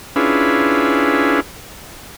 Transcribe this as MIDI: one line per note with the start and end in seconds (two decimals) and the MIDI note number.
0.16 1.40 61
0.16 1.40 62
0.16 1.40 64
0.16 1.40 65
0.16 1.40 68
0.16 1.40 71